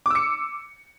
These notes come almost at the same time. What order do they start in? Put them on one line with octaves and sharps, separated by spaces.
D6 E6 C#7